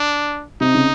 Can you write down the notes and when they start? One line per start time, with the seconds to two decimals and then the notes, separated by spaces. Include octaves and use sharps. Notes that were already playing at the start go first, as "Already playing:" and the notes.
Already playing: D4
0.61 C3 D#4
0.75 C#3